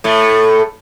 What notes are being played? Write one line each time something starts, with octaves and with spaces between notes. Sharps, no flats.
A2 A3